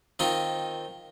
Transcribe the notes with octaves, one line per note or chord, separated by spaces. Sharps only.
D#3 C4 D#4 F4